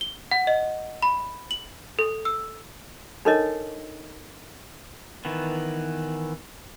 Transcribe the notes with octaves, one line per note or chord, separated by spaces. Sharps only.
G7
F#5
D#5
B5
F#7
A4
E6
D4 D#4 A4 A#4 C#5 D#5
D#3 E3 B3